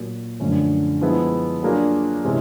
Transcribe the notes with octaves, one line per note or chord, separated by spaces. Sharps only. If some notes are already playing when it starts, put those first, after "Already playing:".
Already playing: A#2 F#3 A#3
F#2 D3 F3 A3 C#4
F3 G#3 B3 E4
F#3 A#3 D4 F4 G#4
C3 E3 G#3 C#4